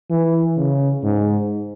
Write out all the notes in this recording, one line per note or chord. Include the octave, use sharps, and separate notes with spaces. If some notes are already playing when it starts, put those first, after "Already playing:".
E3
C#3
G#2